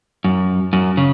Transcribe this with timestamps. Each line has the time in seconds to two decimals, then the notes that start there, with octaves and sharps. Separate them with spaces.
0.24 F#2
0.73 F#2
0.97 C#3